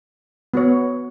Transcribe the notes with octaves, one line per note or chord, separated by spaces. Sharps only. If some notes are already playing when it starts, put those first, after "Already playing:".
B3 F#4 C#5